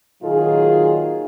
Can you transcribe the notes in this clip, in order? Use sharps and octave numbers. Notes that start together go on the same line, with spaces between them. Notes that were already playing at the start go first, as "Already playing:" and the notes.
A#2 D#3 F#3 D#4 F4 G#4